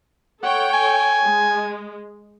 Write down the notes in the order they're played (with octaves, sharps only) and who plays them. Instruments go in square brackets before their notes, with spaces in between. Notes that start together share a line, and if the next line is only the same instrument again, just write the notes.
[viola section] A4 C#5 G5 [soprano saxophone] F#5
[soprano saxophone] G#5
[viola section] G#3